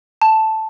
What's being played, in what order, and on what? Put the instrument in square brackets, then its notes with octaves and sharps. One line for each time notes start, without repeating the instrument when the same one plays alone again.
[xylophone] A5